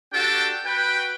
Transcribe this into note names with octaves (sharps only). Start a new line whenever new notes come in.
D4 F#4 G4 A4 G5 A5
F#4 B4 G5